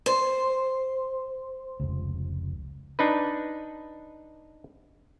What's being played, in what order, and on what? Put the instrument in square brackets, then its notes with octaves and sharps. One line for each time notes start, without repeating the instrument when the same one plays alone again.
[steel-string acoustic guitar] C5
[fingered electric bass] F1 C#2
[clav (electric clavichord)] D4 D#4 B4